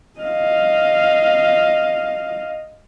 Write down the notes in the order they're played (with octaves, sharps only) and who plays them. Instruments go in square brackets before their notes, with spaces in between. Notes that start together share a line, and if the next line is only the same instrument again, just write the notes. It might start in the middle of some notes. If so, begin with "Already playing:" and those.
[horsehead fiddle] D#5 F5